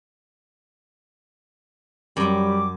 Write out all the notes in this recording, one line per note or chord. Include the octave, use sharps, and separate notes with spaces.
F#2 G3 D6